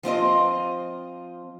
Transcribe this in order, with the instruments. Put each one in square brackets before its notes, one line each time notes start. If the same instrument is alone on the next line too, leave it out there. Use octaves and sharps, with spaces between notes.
[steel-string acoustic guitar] F3 C4 F4 D#5